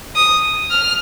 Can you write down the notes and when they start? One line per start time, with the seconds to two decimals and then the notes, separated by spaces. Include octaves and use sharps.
0.16 D#6
0.70 F6